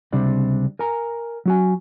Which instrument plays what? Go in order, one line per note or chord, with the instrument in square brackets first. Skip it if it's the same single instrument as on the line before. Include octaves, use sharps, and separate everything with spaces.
[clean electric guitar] C#2 C3 G3 C4 D4 D5
A#4 G#5 A#5
F#3 F#4 G#5